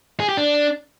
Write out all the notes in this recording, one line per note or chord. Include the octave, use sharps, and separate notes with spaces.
G#4
G4
D4